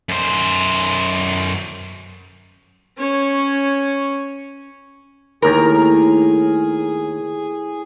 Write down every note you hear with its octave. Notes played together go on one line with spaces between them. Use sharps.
F#2 C5
C#4 C#5
D#2 A2 G#4 A#4 G5 A#5